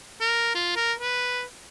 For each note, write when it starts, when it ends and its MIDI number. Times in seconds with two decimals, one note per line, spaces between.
0.21 0.55 70
0.55 0.75 65
0.76 0.93 70
1.00 1.42 71